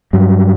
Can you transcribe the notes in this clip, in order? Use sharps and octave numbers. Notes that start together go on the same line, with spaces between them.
G2 F#3